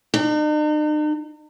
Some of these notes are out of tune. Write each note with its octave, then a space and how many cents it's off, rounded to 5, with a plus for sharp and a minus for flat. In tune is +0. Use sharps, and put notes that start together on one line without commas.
D#4 -45